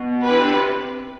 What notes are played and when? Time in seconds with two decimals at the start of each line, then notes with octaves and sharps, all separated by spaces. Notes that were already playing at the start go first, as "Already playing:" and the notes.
Already playing: B2
0.23 G4 B4
0.29 E3
0.41 D3
0.54 C3